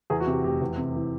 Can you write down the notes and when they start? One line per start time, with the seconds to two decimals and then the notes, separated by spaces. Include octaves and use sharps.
0.10 E2 G#4
0.20 F#4
0.27 C3 G4
0.44 F1 G4
0.62 E2
0.78 C3
0.95 E3